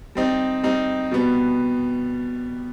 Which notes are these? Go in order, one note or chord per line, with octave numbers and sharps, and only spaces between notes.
G3 C4 D#4
G3 C4 D#4
B2 G3 B3